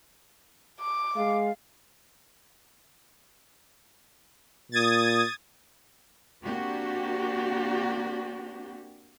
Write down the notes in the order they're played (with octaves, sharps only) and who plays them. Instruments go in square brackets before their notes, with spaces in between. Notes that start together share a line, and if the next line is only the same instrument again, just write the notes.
[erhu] D6
[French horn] G#3 [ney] F5
[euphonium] A#2 [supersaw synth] D#6 G#6 A6
[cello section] A#3 C4 D4 F#4 G4